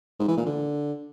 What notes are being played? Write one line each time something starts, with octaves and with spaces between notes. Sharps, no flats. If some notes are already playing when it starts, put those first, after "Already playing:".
G#2
E3
A#2
D3